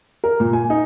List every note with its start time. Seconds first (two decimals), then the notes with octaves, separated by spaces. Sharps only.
0.24 A#4
0.40 A#2
0.53 G#5
0.70 D#4